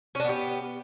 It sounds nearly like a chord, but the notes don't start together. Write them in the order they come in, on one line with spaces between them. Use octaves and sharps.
C#4 D4 B3 G4